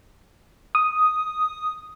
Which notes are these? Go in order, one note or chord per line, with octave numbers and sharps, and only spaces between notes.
D#6